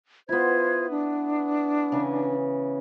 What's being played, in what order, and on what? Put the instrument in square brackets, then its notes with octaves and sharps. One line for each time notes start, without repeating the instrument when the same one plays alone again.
[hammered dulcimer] B3 E4 [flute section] F4 C5 G#6
[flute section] D4
[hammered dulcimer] C#3 E3